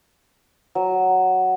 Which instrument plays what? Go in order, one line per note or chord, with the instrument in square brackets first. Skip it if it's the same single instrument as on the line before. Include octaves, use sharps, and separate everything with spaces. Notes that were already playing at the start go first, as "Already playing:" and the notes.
[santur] F#3